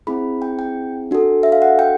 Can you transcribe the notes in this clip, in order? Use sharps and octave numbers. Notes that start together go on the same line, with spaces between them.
C4 E4 G#4 B5
G5
G5
D4 F#4 A4
E5
F5
F#5
G5